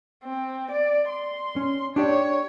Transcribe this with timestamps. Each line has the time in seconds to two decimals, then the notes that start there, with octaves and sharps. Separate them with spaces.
0.23 C4
0.71 D5
1.09 C6
1.56 C#4
1.96 D4 G4 C#5 D5